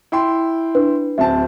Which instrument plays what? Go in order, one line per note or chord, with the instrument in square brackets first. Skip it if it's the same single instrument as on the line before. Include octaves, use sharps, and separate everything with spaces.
[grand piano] E4 G5 C6
[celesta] D4 B4
[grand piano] D1 C4 A5 [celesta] E5